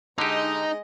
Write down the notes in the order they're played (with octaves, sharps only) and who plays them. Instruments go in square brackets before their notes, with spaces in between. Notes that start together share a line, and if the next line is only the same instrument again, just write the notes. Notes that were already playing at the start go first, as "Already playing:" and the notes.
[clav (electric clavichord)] D3 G4 [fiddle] G#3 D#5 [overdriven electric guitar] D#4